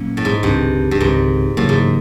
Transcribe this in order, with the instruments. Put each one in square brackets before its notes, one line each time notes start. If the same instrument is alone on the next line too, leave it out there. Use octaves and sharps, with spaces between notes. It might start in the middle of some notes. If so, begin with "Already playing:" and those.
Already playing: [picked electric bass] A#2 F#3 A#3 C#4
[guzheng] A2
G#2
[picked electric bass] C#2 C3 D#3 [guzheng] G2
[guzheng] G2
[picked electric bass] C#2 C3 D#3 [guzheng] G#2
[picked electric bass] E2 C#3 F#3 A#3 [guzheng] A2
[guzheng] G#2